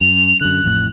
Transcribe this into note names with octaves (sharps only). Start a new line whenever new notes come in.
F#2 F7
F#2 D3 F#6
A1 F2 A2